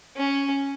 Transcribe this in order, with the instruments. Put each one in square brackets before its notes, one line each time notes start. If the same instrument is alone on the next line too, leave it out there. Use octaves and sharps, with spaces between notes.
[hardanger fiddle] C#4